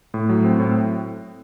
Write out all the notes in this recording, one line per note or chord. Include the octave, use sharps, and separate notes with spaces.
A2
F#3
C4
A2